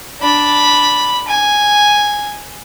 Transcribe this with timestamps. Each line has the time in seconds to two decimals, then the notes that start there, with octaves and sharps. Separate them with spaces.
0.21 D4 B5
1.28 G#5